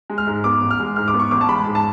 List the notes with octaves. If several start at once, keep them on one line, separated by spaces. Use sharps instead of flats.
G#3
F6
G#2
B3 D6
A1
F6
G#3
G#2 F6
D6
B3
C#6
A1 D6
A5
G#3 B5
G#2
A5